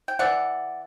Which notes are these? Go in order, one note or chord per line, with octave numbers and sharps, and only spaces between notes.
G5
E3 B3 D5 F#5